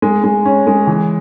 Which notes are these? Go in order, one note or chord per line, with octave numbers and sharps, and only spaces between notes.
G#3
G#3
C#4
G#3
E3